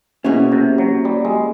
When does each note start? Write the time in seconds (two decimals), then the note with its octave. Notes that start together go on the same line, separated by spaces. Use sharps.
0.24 B2 A#3 C#4 E4 G#4 C#5
0.52 C3
0.78 F#3
1.05 G3
1.25 G#3